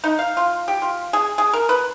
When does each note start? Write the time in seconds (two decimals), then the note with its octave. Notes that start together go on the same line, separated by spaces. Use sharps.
0.04 D#4
0.19 F5
0.37 F4
0.68 G4
0.82 F4
1.13 G#4
1.38 G#4
1.53 A#4
1.69 B4